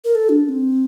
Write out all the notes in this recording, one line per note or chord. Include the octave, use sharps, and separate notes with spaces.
A#4
A4
D4
D4
C4